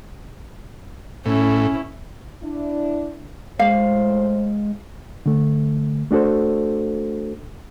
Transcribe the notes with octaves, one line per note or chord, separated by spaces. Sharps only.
A2 C#4 E4
D4 E4
A2 G#3 C5 F5
D3 A3
A3 D4 F#4 A4 C5